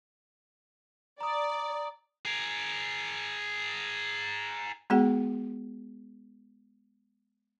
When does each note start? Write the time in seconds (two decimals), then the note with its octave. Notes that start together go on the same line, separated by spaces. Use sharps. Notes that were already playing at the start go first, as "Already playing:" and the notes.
1.21 D5 A#5 D#6
2.25 G#4 A#4
4.90 G#3 B3 F#4 G#4 F#5